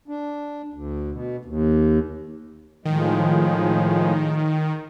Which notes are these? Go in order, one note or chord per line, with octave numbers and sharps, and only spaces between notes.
D4
D2
B2
D#2
A2 D#3 F3 G#3